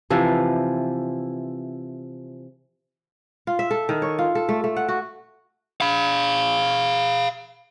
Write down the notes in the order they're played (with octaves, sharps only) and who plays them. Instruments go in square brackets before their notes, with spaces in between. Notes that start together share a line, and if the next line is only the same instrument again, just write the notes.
[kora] C3 E3 F3
F4
E5
A4
D#3
C#5
F4
A4
A3
A3
F#5
F#4
[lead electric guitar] F5 B5